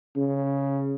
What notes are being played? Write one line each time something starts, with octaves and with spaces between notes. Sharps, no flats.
C#3